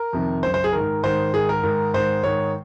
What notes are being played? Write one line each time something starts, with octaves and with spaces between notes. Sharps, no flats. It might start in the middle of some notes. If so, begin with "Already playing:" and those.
Already playing: A#4
F2 C3 D#3
F#2 C#3 C5
C5
G#4
G#2 D#3 A#4
G#2 D#3 C5
G#2 D#3 G#4
A#4
G#2 D#3
G#2 D#3 C5
G#2 D#3 C#5